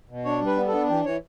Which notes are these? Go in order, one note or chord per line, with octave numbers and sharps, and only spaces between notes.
B2
D4 C#5
G3
B4
B3
A4
D4
E3 G4
E3 C#5